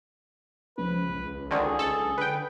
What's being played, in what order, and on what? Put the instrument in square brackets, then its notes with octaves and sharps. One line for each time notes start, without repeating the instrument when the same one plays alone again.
[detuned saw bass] C#2 [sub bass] F3 [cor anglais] B4
[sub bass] B1
[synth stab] D2 D3 D#3 [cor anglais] G#4
[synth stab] A4
[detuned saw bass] D3 [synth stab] B4 G5